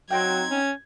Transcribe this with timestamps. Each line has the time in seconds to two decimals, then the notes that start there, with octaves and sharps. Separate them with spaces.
0.11 F#3 C4 D#4 G5 G#6
0.51 C#4